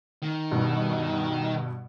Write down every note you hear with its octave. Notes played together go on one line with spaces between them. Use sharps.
D#3
G2 B2